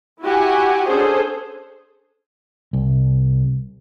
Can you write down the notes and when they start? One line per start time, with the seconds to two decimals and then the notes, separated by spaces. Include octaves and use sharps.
0.22 E4 F#4 G4 F#5 G#5
0.87 C#4 D4 G#4 A4 C5
2.73 C2